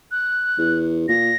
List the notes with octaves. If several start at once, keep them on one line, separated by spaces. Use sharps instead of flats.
F#6
E2
A#2 A#6